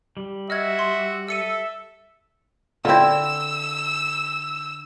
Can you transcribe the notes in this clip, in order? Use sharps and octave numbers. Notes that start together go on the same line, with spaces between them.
G3
F#4 D#5 E5 F6 G#6
C6
A4 E5 E6 C#7 D#7
D3 C4 E4 F4 E6